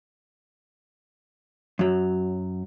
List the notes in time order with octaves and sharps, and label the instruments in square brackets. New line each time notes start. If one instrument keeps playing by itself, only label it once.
[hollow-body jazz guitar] F#2 F#3